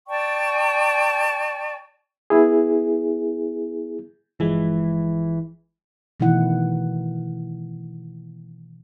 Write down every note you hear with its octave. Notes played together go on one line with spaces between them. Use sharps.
D5 G5 A5 C#6
B3 E4 G#4
G1 E3 F3 G#3
B2 D#3 E3 A3 E4 F#5